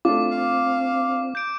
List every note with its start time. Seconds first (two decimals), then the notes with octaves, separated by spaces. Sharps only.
0.05 A3 C4 D4 F4 D6
0.30 F5
1.35 G6 D7